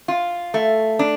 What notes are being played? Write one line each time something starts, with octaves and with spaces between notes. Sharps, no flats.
F4
A3
D4